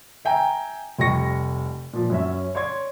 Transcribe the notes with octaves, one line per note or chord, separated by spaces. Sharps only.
E5 G5 G#5 A#5
F1 G3 C#6 A#6 C#7
A#2 F3
F#2 C#4 E5
C#5 D5 C6 G#6